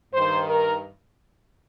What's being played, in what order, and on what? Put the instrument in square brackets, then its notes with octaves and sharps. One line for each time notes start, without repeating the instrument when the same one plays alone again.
[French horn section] G2 D#3 C5
A#4